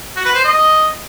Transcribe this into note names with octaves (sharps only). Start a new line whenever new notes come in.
F#4
B4
C5
D#5